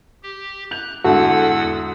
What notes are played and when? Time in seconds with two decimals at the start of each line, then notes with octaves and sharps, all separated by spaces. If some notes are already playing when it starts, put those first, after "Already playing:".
0.23 G4
0.71 F#6 G6 F7
1.05 E2 G#2 D3 E4 F#4 A4 F#5 E6